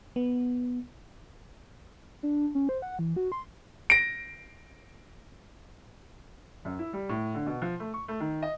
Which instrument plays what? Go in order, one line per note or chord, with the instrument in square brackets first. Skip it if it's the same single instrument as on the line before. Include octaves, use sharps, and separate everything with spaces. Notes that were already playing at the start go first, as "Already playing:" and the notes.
[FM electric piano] B3
[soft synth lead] D4
C#4
C5
F#5
E3
F#4
C6
[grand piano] A#6 D7
[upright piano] F#2
E4
G3
A2
D3
B2
F3
A3
C#6
A3
D#3
D#5